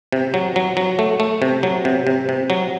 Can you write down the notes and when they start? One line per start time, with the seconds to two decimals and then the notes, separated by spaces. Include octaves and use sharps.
0.12 C3
0.34 F#3
0.56 F#3
0.77 F#3
0.99 A3
1.20 A3
1.42 C3
1.63 F#3
1.85 C3
2.07 C3
2.29 C3
2.50 F#3